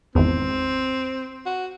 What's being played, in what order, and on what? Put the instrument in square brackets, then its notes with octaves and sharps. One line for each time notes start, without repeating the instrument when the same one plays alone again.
[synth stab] G#1 E2 [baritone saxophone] C4
[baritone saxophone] F#4